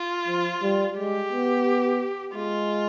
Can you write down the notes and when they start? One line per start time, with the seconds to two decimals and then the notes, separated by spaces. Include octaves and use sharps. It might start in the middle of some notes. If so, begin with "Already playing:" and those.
Already playing: F4
0.28 F3
0.62 G3
0.97 G#3 G4
1.32 B3
2.35 G#3 F4